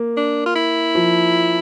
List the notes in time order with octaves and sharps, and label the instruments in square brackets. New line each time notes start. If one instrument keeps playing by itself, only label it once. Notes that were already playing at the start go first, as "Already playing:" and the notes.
Already playing: [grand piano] A#3
[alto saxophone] D4
F4
E4
[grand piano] F3